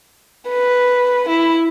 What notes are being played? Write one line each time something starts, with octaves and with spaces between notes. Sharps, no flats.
B4
E4